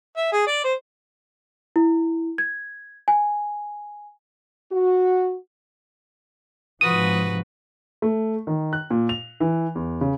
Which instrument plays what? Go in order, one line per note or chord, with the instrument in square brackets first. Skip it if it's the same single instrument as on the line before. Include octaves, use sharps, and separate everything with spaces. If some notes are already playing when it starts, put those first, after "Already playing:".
[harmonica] E5
G#4
D5
C5
[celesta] E4
G#6
G#5
[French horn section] F#4
[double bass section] G#2 C3 F3 [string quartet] F#4 B4 [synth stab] D#6
[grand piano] A3
D#3
F#6
A#2
F7
E3
E2
C#3